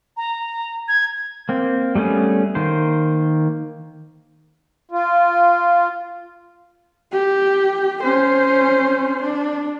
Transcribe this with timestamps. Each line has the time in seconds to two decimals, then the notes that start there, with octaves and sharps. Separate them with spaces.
0.17 A#5
0.88 G#6
1.49 A#3 C4
1.95 G3 A3 B3 C#4 G#4
2.55 D#3 A#3 C5
4.91 F4
7.12 G4
8.03 C#4 C5
9.22 D4